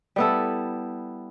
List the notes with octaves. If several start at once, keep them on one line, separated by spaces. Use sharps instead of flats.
G3 B3 E4 A4